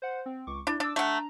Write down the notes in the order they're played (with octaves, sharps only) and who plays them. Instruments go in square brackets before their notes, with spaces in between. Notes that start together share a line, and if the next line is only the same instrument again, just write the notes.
[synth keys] C5 F#5
C4
C#2 C#6 D6
[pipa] D4 [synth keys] E4
[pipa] D4 [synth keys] D6 E6
[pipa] A3 F#5 [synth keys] D4 A#5